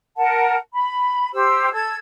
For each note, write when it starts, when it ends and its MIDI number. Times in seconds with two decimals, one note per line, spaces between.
0.17 0.55 70
0.17 0.55 78
0.17 0.55 81
0.73 1.31 83
1.33 1.72 67
1.33 1.72 72
1.33 1.72 88
1.72 1.94 69
1.72 1.94 88
1.72 1.94 92